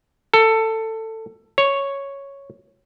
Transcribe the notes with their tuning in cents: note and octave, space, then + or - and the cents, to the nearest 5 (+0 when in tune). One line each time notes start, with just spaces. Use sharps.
A4 +15
C#5 +0